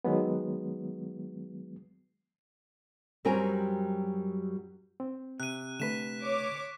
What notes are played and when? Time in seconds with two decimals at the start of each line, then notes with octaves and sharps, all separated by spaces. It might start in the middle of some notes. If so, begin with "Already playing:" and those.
0.05 D#3 F#3 G#3 B3
3.25 F#2 F#3 G3 C4 A#4 G#5
5.00 C4
5.40 C3 F#6 D#7
5.80 D3 A3 B4 B6 E7
6.22 C#5 D6